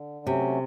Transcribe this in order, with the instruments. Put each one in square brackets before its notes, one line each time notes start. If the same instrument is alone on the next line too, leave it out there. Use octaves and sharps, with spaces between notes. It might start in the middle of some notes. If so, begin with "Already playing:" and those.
Already playing: [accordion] D3
[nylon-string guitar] C3 [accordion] F#3 A3 C#4